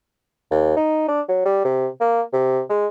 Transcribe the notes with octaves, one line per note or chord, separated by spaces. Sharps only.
D#2
D#4
D4
F#3
G3
C3
A#3
C3
G#3